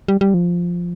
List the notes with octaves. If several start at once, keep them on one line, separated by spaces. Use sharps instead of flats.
G3
G3
F3